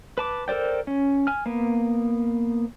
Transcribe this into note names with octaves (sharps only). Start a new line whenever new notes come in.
B4 A5 D6
A4 A#4 C5 D5 G5
C#4
G#5 F6
A#3 B3